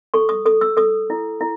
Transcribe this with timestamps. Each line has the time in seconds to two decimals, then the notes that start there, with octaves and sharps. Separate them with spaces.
0.14 A4 C#6
0.29 D#6
0.46 A4 D#6
0.61 E6
0.77 A4 D#6
1.10 E4
1.41 E4